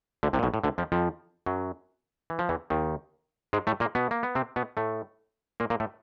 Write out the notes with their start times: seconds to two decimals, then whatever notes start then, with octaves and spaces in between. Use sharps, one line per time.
0.23 D2 D3
0.33 C2 C3
0.39 A#2
0.43 B1 B2
0.54 A2
0.64 D2 D3
0.78 F2 F3
0.92 F2 F3
1.46 F#2 F#3
2.30 E3
2.39 F3
2.49 E2 E3
2.70 D#2 D#3
3.53 G#2 G#3
3.67 A2 A3
3.80 A#2 A#3
3.95 B2 B3
4.11 A#3
4.23 B3
4.35 C3 C4
4.56 B2 B3
4.77 A2 A3
5.60 A#2 A#3
5.70 A#2 A#3
5.80 A2 A3